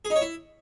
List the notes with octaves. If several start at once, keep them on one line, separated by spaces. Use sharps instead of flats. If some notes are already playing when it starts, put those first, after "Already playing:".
G#4
D#4
C#5
E4